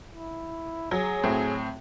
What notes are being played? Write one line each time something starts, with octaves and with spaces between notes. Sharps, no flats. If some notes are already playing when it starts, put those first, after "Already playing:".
E4
F#3 G#4
A2 C4